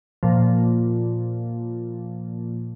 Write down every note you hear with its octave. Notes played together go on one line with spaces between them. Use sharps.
A#2 F3